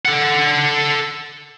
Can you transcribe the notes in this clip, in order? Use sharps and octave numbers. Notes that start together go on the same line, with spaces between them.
A4 F#5